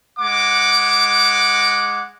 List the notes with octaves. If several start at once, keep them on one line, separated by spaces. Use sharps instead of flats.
G#3 F#5 D6